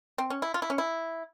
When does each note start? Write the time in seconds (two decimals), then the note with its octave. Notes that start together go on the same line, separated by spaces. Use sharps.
0.18 C4
0.30 C#4
0.42 E4
0.54 F4
0.62 E4
0.70 C#4
0.78 E4